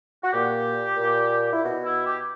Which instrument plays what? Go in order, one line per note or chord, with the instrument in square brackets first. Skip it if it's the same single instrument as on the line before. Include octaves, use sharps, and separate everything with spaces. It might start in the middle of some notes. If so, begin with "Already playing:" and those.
[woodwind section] F#4
A#2 G4
A#2
E4
B2 F#4
E4
G4